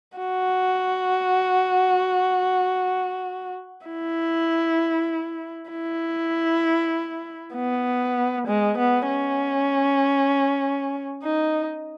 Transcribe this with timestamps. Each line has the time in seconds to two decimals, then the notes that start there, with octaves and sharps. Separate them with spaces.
0.18 F#4
3.87 E4
5.71 E4
7.55 B3
8.48 G#3
8.78 B3
9.08 C#4
11.24 D#4